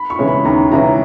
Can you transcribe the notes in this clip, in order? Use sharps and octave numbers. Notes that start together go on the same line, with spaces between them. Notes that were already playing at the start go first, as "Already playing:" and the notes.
Already playing: B5
C#6
C#3 E3 G#3 C#4
B5
D#2 A#5
C#3 E3 G#3 C#4 A#5